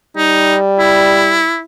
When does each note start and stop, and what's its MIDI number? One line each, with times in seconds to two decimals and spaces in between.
0.17 1.47 55
0.17 0.56 63
0.79 1.62 64